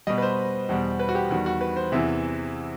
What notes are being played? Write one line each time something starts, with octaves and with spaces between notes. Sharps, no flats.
B2 G3 D#5
B4
C5
E2 B2 G3
B4
F#4
G4
E2 D#3 G3 F#4
F#4
B4
C5
E2 C3 E3 E5